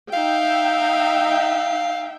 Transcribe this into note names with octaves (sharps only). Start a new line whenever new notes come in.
D#4 E5 F5 G5